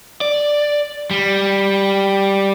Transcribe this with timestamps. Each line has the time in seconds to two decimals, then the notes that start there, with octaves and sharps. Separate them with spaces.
0.21 D5
1.11 G3